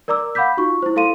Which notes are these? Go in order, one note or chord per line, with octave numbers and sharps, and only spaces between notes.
A#4 D5 A#5 D6 E6
F5 F#5 B5 D6 G6 B6
D#4 F4 F#4 C#6
E4 C5
E4 A4 F5 C6 D#7